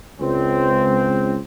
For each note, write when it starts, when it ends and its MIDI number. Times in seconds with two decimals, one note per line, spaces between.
0.20 1.38 37
0.20 1.38 60